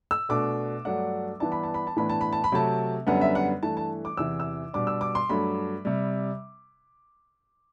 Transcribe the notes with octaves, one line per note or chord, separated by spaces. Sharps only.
E6
B2 A3 D4 D6
G2 F#3 A3 D4 F#5
G2 E3 B3 D4 A5
B5
A5
B5
A5
A2 E3 B3 D4 B5
A5
B5
A5
B5
C3 F#3 A3 C4 A5
F#2 D3 G3 B3 F#5
E5
F#5
G2 E3 A3 A5
A5
D6
E2 C3 E3 E6
E6
B2 G3 D4 D6
E6
D6
C6
G2 F#3 A3 B5
C3 G3